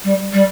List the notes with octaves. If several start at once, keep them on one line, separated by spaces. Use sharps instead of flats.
G3
G3